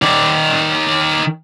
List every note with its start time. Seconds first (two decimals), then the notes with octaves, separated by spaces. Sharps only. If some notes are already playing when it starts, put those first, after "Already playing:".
0.02 D#3 D5